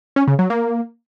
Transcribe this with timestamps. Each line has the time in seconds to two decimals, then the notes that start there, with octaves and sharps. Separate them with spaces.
0.16 C#4
0.28 C#3
0.39 F#3
0.50 A#3